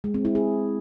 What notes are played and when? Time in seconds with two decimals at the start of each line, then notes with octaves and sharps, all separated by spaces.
0.04 G#3
0.14 C4
0.25 E4
0.35 G#4